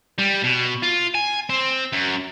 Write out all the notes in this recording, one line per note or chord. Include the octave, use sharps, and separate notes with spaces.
G3
B2
F4
G#5
C4
F#2